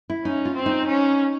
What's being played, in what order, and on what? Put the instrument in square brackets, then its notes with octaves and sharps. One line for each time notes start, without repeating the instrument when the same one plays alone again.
[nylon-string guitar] E4
[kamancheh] C#4 [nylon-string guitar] D#4
[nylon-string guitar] F4
[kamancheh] C4
[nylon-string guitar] D#4
[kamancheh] C#4